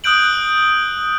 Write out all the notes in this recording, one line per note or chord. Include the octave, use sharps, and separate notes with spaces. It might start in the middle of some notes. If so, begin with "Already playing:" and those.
D#6 E6 F#6 G6 D7 F#7